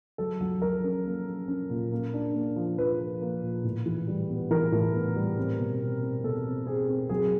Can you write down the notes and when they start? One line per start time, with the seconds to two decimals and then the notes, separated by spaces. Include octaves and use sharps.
0.18 F#3 A4
0.41 F#3
0.62 F#3 A#4
0.84 C#4
1.05 A#3
1.27 A#3
1.48 C#4
1.70 A#2
1.92 A#3
2.13 D4
2.34 A#3
2.56 F3
2.78 F3 B4
2.99 F3
3.21 A#3
3.43 A#2
3.64 A2
3.86 E3
4.08 G3
4.29 B3
4.51 E3 A#4
4.72 A2
4.93 B3
5.16 G3
5.37 C4
5.59 B2
5.81 C4
6.02 C4
6.24 B2 A4
6.46 C4
6.67 C4 G#4
6.88 C4
7.09 F#3 G#4